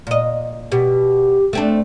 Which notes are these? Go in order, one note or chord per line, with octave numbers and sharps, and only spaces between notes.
A#2 D#5
B2 G4
A3 C4 D4